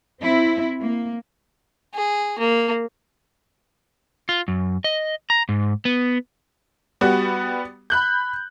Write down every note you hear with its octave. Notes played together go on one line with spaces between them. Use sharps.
C4 E4
A#3
G#4
A#3
F4
F#2
D#5
A#5
G#2
B3
G3 B3 F#4
B5 F#6 G6